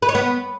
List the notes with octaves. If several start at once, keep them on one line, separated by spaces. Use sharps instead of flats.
B4
C#5
B3